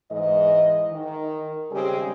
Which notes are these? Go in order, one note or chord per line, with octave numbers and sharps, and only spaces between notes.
G#2 E3 G#3 D#5
D#3
C#3 G3 G#3 C4 G4 G#4